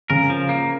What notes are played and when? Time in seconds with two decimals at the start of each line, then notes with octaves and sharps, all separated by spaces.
0.10 C#3 A#4
0.30 F3
0.49 A#3